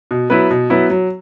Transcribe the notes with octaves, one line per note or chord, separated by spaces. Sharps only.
B2
F#3 B3 E4 B4
B2
F#3 B3 E4 B4
F#3